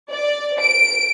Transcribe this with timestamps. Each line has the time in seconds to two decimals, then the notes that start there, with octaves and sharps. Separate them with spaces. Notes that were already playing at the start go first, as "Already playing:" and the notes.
0.12 D5
0.60 D7